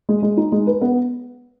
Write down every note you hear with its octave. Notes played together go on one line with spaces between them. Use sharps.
G#3
G#3
D#4
G#3
B4
B3